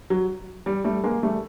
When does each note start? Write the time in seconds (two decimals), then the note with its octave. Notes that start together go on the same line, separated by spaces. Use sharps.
0.10 F#3
0.66 G3
0.84 G3 A3
1.04 G#3 A#3
1.22 G3 A3